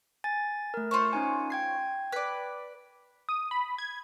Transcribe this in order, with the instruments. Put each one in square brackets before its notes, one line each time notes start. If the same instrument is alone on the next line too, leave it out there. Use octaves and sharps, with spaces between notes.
[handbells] G#5 A6
A3 A#4
[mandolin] F4 C5 C#5
[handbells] C#4 D#4 G#5
G5 G#6 C7
[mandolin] B4 D5
[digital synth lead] D#6
B5
G#6